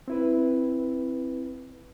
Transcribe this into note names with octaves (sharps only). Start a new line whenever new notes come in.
C4 E4 B4